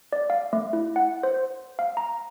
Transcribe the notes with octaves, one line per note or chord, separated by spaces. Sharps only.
D5
F5
A3
E4
F#5
C5
F5
A#5